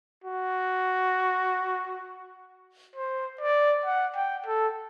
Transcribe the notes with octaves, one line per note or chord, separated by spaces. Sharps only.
F#4
C5
D5
F#5
G5
A4